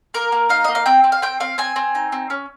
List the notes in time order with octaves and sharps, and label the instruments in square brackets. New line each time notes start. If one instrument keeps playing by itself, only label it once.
[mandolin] A#3 A#4
A#3
D#4 F5
A#3 D#5
F5
C4 G5
C4
F5
C4 G5
C4 F5
C4 G#5
C4
D#4
C4
C#4